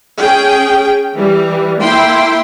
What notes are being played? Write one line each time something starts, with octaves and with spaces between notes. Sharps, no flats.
C#4 G#4 G5
E3 G3
A#3 E4 G5 C6